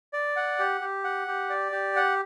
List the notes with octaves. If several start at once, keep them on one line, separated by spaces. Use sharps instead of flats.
D5
F#5
G4
G4
F#5
G4
D5
G4
F#5